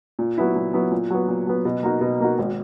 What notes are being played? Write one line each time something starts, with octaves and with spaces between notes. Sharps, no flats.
A#2
F#3 B3 E4
A#2
F#3 B3 E4
A#2
F#3 B3
A#2
F#3 B3
B2
A#3 D#4 F#4
B2
A#3 D#4 F#4
G#1